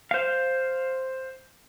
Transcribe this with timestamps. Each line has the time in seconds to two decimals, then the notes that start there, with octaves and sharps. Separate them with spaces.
0.11 C5 F5